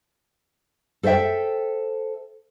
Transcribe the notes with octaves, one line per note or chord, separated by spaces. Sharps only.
A4 C5 D5 E5 G5